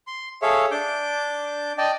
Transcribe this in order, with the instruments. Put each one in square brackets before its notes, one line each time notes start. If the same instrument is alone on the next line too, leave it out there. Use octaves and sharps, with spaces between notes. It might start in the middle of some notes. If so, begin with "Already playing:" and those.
[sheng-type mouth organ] C6
G#4 A4 C#5 E5 F5
D4 D6 G6
D5 D#5 G5 A5